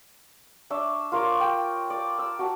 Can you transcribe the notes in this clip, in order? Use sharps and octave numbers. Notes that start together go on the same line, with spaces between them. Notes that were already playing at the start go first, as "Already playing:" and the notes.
D4 C#5 E5
F4 A#4 C#5 D6
G5
D5
E6
F#4 A5